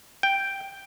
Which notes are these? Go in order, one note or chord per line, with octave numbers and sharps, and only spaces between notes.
G5